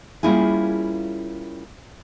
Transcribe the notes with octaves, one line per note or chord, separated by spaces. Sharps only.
G3 A#3 C#4 E4 F4 G#4